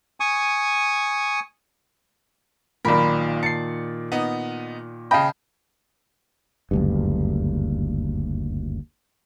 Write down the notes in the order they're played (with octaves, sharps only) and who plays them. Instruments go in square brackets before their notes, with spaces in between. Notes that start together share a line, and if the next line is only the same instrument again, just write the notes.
[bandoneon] G#5 C#6 D#6
[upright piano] B1 A#4 [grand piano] A#2 D#3 D5 [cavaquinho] B5
[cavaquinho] A5 [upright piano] C7 C#7
[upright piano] B3 D#4
[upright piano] C#3 D#5 [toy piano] F5 A5 B5 [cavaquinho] G5
[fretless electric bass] F#1 D2 G2